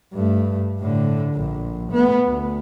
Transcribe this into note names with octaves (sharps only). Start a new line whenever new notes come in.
G2 A3
A2 D3
A#1
A3 B3
D2